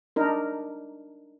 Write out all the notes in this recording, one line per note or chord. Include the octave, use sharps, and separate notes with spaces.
D4 D#4 A#4